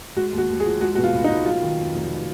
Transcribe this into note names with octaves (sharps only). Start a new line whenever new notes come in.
G#3 F#4
D#2
F#4
D#2
G#4
F3
G#3 F#4
B2 F#4
F4
C#2
D#4
B2
F#3 F4
D#3
F2
F1